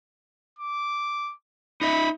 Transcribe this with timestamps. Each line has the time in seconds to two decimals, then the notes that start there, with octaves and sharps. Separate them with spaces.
0.59 D6
1.81 D#4 D#5 E5 B5